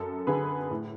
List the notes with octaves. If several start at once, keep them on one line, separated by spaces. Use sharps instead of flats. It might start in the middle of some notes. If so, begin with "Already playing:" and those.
Already playing: F#2 A4
D3 G#4 B4
A2